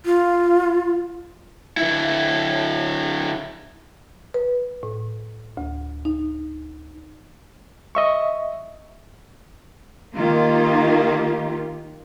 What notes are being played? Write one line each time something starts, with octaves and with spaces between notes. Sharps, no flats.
F4
D3 E4
B4
A2
D2
D#4
D#5 E5 C#6
D#3 A#3 F4 G4